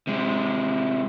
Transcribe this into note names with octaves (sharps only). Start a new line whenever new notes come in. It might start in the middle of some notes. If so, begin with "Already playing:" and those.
C3 G#3